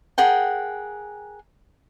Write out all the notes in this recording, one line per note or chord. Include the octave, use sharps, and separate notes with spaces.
G#4 A#4 F#5 G5